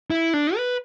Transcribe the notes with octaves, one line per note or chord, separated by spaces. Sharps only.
E4
D4
B4